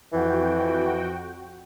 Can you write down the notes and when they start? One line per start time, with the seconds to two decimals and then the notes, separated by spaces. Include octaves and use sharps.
0.12 F2 E3 F#4 G5